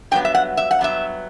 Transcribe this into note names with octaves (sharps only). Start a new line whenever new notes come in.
G2 F#3 B3 G5
E5
F#5
E5
F#5
G2 F#3 B3 E5